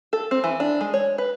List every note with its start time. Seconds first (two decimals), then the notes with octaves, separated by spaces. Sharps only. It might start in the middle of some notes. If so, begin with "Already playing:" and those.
0.13 A4
0.31 C4
0.44 E3
0.60 D4
0.81 G#3
0.94 C#5
1.18 B4